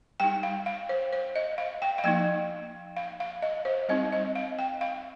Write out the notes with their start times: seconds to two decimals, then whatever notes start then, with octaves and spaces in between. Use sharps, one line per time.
0.20 G3 D#4 G5
0.43 F5
0.66 F5
0.89 C5
1.13 C5
1.36 D#5
1.58 F5
1.82 G5
1.98 F5
2.04 F3 A#3 D#4 G5
2.97 F5
3.20 F5
3.42 D#5
3.65 C5
3.89 G3 C4 D#4 D#5
4.12 D#5
4.36 F5
4.59 G5
4.81 F5